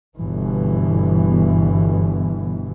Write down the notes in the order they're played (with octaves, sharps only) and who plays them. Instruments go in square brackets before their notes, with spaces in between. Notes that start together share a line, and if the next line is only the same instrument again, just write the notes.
[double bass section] G1 B2 E3